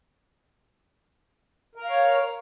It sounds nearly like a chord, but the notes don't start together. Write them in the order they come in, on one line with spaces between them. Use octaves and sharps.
A#4 A#5 F5 C#5